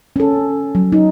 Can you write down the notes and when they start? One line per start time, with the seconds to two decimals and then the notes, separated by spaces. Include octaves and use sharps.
0.16 C#4 A4
0.75 F#3
0.92 D#4